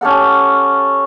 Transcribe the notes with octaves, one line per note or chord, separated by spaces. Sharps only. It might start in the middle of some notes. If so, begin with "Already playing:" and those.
C#4 G4 A4 F#5